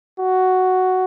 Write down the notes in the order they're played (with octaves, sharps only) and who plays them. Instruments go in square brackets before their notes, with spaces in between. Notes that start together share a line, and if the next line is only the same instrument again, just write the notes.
[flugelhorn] F#4